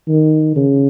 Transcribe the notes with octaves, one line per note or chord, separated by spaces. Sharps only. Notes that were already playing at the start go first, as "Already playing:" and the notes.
D#3
C#3